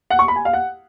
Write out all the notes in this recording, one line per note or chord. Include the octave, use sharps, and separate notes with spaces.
F#5
C#6
B5
G#5
F5
F#5